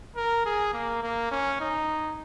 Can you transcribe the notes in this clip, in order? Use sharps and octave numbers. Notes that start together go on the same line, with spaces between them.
A#4
G#4
A#3
A#3
C#4
D#4